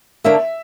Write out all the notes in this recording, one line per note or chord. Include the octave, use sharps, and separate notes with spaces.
D3 A#3 D4 A#4 C#5 E5